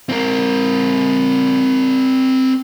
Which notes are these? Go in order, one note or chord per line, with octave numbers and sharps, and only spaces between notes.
C4 A#4